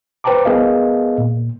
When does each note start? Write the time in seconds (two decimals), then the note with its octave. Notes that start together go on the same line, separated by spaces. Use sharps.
0.24 B4 C5 G5 A5 A#5 D6
0.45 B3 G#4 A#4 D#5 F5
1.18 A#2